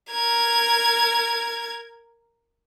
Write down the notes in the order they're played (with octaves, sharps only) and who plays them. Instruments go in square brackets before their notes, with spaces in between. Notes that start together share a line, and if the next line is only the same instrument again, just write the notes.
[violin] A#4 G#6